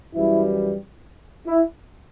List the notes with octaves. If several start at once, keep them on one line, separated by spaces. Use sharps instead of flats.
F#2 E3 G3 E4
E4